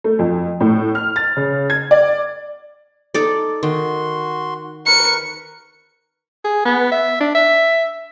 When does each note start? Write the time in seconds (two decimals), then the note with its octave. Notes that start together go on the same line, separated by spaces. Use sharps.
0.04 A3
0.19 F2
0.60 A2
0.95 F6
1.16 A6
1.37 C#3
1.70 G#6
1.91 D5
3.14 D#4 A4 D5
3.63 D#3 F#4 C6
4.87 A#4 B4 C#6 C#7
6.45 G#4
6.65 B3
6.92 E5
7.21 D4
7.35 E5